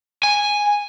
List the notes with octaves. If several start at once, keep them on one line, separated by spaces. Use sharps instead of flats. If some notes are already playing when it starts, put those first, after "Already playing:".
G#5